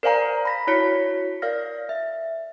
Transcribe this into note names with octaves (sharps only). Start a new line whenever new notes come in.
A#4 C5 D5 F5 G#5 A#5
B5 A#6 B6
E4 F#4 C#5 B6 C#7
A#4 D5 F5 F6 A#6
E5